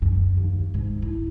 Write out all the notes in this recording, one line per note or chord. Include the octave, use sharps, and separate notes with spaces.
F#2
D#2
G#2
E4